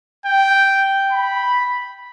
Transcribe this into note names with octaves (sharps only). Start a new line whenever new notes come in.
G5
B5